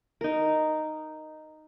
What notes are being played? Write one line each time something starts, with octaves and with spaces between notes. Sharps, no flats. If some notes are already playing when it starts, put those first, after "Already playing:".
D#4 A#4